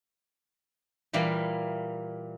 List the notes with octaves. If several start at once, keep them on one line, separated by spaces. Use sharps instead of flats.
A#2 E3 G3 A#3